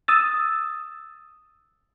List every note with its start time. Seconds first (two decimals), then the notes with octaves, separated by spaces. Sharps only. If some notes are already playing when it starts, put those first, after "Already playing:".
0.08 D#6 E6 A6